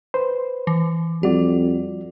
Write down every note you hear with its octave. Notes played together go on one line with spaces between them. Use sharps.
B4 C5
E3
F2 G3 F#4 G4 D5